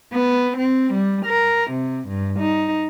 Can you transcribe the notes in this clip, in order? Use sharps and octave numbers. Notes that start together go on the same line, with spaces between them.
B3
C4
G3
A#4
C3
G2
D#4